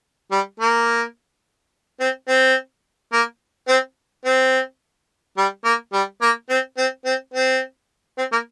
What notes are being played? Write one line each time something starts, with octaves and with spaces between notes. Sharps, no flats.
G3
A#3
C4
C4
A#3
C4
C4
G3
A#3
G3
A#3
C4
C4
C4
C4
C4
A#3